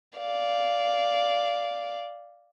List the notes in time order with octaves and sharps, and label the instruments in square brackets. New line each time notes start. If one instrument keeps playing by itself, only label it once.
[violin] D5 F5